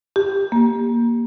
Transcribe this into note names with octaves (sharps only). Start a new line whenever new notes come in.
G4
A#3